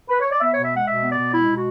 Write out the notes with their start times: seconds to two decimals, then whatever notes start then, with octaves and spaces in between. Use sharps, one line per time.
0.09 B4
0.20 C#5
0.31 D5
0.40 B3 E5
0.52 B2 C#5
0.63 E5
0.71 G#3 F#5
0.87 B2 E5
1.02 B3
1.10 D5
1.17 B2
1.33 G#3 E4
1.48 B2
1.56 F#4